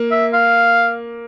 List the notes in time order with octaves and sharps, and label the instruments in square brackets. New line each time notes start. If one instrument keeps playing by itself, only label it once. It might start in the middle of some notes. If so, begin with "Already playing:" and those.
Already playing: [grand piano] A#3
[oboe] E5
F5